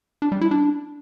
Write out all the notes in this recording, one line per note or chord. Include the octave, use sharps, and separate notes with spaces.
D4
G3
E4
D4